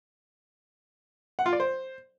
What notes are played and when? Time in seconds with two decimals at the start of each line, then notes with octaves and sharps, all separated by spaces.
1.39 F#5
1.46 F4
1.53 D5
1.60 C5